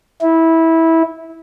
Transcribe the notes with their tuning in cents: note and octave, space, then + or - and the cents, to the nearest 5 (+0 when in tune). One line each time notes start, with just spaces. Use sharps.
E4 -15